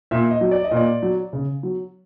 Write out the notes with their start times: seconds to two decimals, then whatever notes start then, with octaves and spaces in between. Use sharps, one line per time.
0.11 A#2 E5
0.31 D#5
0.41 F#3
0.51 D5
0.64 D#5
0.71 A#2 D5
1.02 F#3
1.33 C#3
1.63 F#3